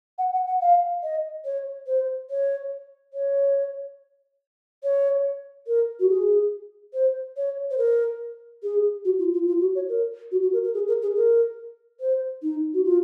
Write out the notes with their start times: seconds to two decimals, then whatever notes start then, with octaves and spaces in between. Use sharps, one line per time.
0.18 F#5
0.33 F#5
0.47 F#5
0.61 F5
1.03 D#5
1.45 C#5
1.87 C5
2.30 C#5
3.13 C#5
4.83 C#5
5.67 A#4
6.00 F#4
6.10 G#4
6.93 C5
7.37 C#5
7.71 C5
7.78 A#4
8.63 G#4
9.05 F#4
9.19 F4
9.34 F4
9.47 F4
9.61 F#4
9.75 C#5
9.89 A#4
10.31 F#4
10.42 F#4
10.53 A#4
10.64 A#4
10.74 G#4
10.88 A#4
11.02 G#4
11.15 A#4
12.00 C5
12.42 D#4
12.74 F#4
12.84 F4